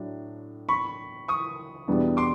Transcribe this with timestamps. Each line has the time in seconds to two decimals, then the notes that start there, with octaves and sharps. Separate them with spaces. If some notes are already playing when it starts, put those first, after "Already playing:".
Already playing: A2 F#3 D4
0.69 B5 C#6
1.28 C#6 D#6
1.88 E2 B2 G3 B3 D4
2.17 C6 D6